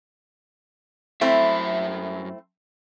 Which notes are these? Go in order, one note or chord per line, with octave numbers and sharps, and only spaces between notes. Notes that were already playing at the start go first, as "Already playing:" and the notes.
F#2 A3 C4 E4 E5